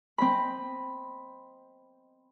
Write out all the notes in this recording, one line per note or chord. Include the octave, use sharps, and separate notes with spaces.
C4 D#5 B5